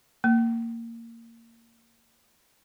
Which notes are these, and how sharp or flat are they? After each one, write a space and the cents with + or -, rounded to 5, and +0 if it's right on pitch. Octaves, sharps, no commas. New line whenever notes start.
A#3 -20